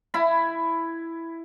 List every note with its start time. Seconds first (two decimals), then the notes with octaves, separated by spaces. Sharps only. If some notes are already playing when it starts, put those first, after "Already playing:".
0.14 E4 B5